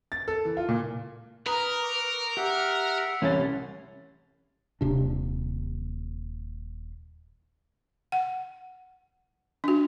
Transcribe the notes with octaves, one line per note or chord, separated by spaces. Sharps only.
A6
A4
E3
F4
A#2
A#4 B4 A#5 D#6
C#6 D6
G4 E5 F#5
C2 E3 C#4 C#5 G#5 C6 A6
D#1 C3 D4
F#5
D4 F#4